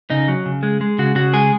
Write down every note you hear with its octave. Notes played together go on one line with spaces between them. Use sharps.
C#3 D#4
F#3
C#3
G#3
G#3
C#3 F#4
C#3 F#4
G#3 G#4